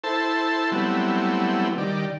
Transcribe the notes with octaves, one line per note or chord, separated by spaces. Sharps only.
E4 A4 C5 A5
F#3 G3 A3 B3 C4 E4
D#3 G3 D5